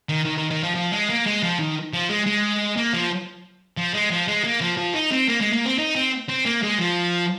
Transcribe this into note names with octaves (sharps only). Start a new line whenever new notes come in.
D#3
D#3
D#3
D#3
F3
F3
G#3
A#3
G#3
F3
D#3
F3
G#3
G#3
A#3
F3
F3
G#3
F3
G#3
A#3
F3
F3
D#4
C4
A#3
G#3
A#3
C4
D#4
C4
C4
A#3
G#3
F3